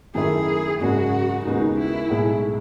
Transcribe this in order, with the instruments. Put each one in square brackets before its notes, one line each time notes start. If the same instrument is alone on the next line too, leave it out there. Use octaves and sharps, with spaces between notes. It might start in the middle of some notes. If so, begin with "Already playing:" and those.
[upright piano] F#2 D#3 A3 E4 [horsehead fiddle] G#4
[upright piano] G#1 F#2 C#3 G#3 [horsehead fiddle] F#4
[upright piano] D#2 C#3 G#3 B3 F#4 [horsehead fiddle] D#4
[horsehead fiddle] E4
[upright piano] B1 A2 G#3 D#4 G#4